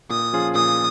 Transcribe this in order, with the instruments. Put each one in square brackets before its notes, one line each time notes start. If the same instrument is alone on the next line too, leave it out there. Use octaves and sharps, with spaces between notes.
[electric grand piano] A#2 [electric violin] D#6
[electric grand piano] F3 C#4 F4 G#4
[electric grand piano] A#2 [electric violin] D#6